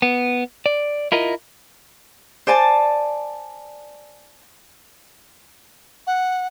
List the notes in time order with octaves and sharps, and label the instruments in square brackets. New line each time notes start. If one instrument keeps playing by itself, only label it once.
[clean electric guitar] B3
D5
E4 F4 A#4 D#5
[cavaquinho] C5 D5 G#5 A5
[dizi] F#5